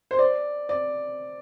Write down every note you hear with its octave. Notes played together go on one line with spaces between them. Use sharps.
C5
D5
D5